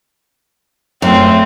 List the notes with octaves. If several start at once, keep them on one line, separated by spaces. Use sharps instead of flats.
F#2 A3 C4 F4